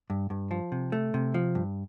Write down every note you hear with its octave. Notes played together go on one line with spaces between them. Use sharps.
G2
G2
F3
C3
A3
C3
F3
G2